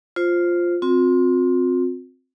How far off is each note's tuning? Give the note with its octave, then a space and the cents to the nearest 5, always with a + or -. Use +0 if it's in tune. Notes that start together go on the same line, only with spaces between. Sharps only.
F4 +0 C5 +0
C4 +0 F4 +45